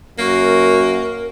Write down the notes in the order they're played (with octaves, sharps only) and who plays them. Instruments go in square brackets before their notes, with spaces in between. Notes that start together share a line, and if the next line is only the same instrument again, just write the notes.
[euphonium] F#2 [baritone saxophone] A#3 [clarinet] F#4 [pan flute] A#4